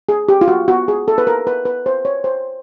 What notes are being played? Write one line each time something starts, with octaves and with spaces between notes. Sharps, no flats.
G#4
G4
F4
F#4
F#4
G#4
A4
B4
A#4
B4
B4
C5
C#5
C5